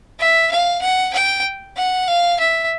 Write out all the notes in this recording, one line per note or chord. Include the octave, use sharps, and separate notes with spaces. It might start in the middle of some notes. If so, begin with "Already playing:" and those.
E5
F5
F#5
G5
F#5
F5
E5